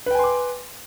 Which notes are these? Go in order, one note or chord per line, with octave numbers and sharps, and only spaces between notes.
B4 G5 G#5 C6 D6